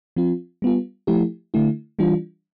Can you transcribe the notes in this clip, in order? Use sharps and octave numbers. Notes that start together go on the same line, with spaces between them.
F3 C4 F4
G3 B3 F4
F3 A3 E4 G4
D3 A3 E4
E3 G3 D4 F4